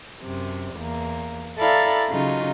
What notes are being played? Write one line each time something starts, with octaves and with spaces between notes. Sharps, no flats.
F#2 C3
E2 A#3
E4 A4 D5 F5 A#5 B5
C#3 F#3 D#4 F4